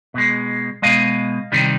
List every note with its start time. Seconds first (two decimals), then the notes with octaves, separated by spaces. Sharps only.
0.14 B2 G#3
0.82 B2 G#3 D#5 F5
1.52 C3 D#3 G3